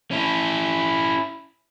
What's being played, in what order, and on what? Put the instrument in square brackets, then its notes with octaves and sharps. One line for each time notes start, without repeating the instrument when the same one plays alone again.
[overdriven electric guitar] C#4 E4